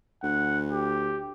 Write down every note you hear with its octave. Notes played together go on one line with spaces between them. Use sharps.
D2 F#5
G4